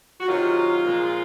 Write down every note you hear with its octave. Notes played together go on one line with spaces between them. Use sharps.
F#4
C3 D#3 F#3 F4
A#2 F3 G#3